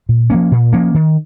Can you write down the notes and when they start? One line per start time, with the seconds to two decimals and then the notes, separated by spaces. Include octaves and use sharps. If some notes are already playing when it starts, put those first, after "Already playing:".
0.09 A#2
0.30 F3 A#3 C#4
0.52 A#2
0.73 F3 A#3 C#4
0.94 D#3